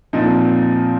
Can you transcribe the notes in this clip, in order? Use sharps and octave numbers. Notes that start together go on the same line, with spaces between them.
A#2 F3 C4 D#4